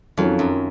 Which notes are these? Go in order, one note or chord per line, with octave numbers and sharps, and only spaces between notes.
F2 D#3 F#3 C#4 F4
F#2